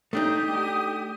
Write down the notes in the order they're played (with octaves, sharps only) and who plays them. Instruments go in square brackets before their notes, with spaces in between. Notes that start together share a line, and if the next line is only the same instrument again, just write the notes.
[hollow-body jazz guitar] A3 D4 D#4 [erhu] G4 [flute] D#6